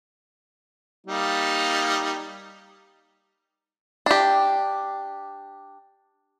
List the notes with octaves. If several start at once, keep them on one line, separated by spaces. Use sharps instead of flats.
G3 A#3 D#4
D4 G4